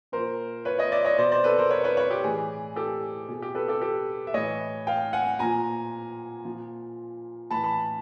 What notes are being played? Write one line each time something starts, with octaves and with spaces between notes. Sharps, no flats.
A#2 F3 A#4 C5
B4 C#5
C#5 D#5
D5 E5
C#5 D#5
B2 C5 D5
C5 D5
A4 B4
A#4 C5
B4 C#5
B4 C#5
B4 C#5
G4
A2 E3 G#4
G4 A4
B2 G#4
G4
A4 B4
G4 A4
G4 A4
E5
A2 E3 C#5 D#5
F5 G5
F#5 G#5
A#2 F3 G#5 A#5
A#2 F3
A2 E3 A5 B5
A5 B5